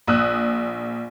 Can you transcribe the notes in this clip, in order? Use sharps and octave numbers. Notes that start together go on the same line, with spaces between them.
A#1 D#6 E6 F#6